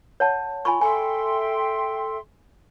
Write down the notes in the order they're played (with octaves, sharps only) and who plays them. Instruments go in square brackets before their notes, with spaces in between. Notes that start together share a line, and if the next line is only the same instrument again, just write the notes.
[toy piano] C#5 F#5 A5
[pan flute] F4 [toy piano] G#5 B5 C#6
[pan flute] A4 [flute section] E5 G5 C6 [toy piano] G#5